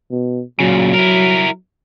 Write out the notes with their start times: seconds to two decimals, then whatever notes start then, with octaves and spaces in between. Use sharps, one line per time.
0.11 B2
0.60 A#2 C#3 F#3
0.94 E4 A#4